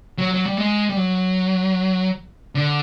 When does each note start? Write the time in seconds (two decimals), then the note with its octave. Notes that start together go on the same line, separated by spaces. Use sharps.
0.18 F#3
0.34 F#3
0.46 G3
0.57 G#3
0.89 G3
0.97 F#3
2.55 D3